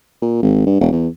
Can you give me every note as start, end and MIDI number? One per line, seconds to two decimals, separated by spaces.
0.22 0.39 46
0.43 0.62 32
0.67 0.78 43
0.80 0.89 28
0.92 1.08 40